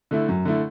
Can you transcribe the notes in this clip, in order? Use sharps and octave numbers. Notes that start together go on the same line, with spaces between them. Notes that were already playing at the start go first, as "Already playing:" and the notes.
D3 A3 E4
F#2
D3 A3 E4